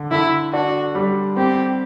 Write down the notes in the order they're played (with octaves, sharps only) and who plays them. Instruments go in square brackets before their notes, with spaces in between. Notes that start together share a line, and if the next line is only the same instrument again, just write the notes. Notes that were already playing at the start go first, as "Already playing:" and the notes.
Already playing: [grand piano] D3
[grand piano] D3 [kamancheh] E4
[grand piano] D4 [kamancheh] F#4
[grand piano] G3
[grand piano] C4 [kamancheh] G4